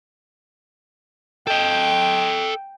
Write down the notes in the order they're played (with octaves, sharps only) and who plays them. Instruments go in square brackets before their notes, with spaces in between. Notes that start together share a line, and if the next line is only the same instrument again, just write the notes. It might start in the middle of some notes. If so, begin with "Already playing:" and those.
[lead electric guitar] A4 D#5 [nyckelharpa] G5